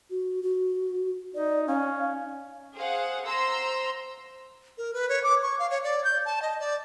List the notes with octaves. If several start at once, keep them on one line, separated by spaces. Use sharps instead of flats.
F#4
F#4
D#4 D5
C#4 F5
G#4 C5 F5 F#5
C5 A#5 C6 E6
A#4
B4
C#5
D6
C#6
F5
C#5
D5
G6
A5
D#5
D5